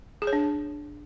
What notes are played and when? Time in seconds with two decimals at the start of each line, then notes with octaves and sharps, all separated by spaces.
0.22 G#4
0.27 C#5
0.33 D4